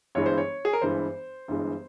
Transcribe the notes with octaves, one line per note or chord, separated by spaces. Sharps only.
G1 G2 E3 G#3 C#5
C5
C#5
G#4
A#4
G1 G2 E3 G#3 C5
G1 G2 E3 G#3